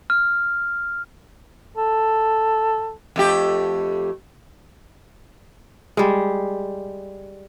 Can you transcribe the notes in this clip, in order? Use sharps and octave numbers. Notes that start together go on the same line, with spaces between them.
F6
A4
F2 A3 G4
G3 G#3